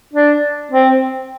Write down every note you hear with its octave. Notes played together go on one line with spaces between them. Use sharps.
D4
C4